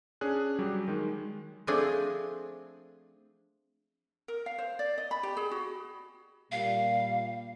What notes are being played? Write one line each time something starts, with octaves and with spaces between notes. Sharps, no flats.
C#4 D4 G#4 F#6
F#3 G3 G4
D#3 G#3
F3 A3 C4 D4 G#4 D5
A#4
F5
C5
D5
D#5
B5
G4
G#4
F#4
A#2 G3 F5